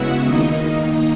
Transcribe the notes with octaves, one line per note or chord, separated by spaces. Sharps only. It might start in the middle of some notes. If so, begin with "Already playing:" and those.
Already playing: C#3 G#3 B3 E4 F#4 E5 F#5
D#3 A#3 D#4 D#5